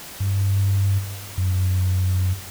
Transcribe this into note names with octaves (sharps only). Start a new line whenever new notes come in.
G2
F#2